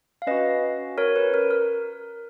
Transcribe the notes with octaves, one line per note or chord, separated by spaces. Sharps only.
F5
C#4 F#4 B4 D#5
A#4 C#5
B4
A#4
A#4